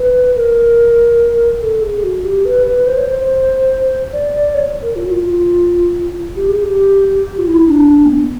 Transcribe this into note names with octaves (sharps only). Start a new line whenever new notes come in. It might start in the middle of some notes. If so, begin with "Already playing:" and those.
Already playing: B4
A#4
A4
G#4
F#4
G4
B4
B4
C5
C#5
C5
D5
D5
C#5
A#4
F4
F#4
F4
G4
G#4
G4
F4
E4
D4
D4
A#3
B3